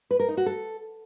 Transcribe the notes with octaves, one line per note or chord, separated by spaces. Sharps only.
B4
A#4
D#4
F#4
A4